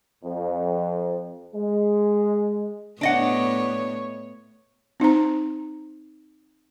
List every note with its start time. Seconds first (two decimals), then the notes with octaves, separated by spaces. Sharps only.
0.23 F2
1.54 G#3
3.01 A2 B3 D4 C#5 D#5 F#5
5.00 C4 D#4 C5 A#5